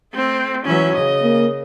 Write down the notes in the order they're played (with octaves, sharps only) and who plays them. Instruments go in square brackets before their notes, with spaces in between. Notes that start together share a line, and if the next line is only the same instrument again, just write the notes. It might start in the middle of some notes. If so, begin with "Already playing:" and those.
[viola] A3 C4
[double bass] E3 F#3 [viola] C#4 E5
[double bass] C#3 [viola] D#5
[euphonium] A#3